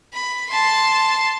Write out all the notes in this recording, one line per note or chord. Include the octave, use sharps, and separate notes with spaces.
B5
A5 C6